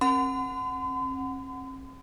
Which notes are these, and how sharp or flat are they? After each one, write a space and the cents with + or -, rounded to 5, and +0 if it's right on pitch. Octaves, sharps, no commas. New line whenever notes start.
C4 +45 F#5 +0 C6 -45